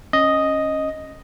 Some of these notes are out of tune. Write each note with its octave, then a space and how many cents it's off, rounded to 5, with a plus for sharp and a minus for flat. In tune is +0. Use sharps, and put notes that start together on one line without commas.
C#4 -15 D#5 +0